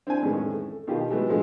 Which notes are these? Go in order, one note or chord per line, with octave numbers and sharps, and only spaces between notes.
C4 D4 E4 G#5
F2 A2 D#3 E3 G#3 C#4
A3
B2 D#3 F4 G4 G#4
E3 F#3 G#3 A3 B3
A2 F3 G#3 A3 D4 G#4